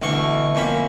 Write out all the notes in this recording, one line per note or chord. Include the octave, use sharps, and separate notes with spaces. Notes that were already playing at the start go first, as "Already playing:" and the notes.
D2 B2 E3 C#6
F2 A#3 C#4 B5